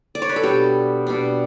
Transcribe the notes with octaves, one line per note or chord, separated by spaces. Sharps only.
D5
C#5
B4
A4
B2 G3 D4 G4
B2 G3 D4